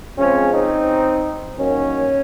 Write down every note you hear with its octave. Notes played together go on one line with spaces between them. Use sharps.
C#3 F3 G#3 C4 C#4
C4 D#4
D#3 F#3 A#3 C#4